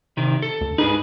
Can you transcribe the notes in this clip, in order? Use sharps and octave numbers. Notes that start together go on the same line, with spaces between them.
C3 D#3
A4
D2
G#2 D#4 G#4 B4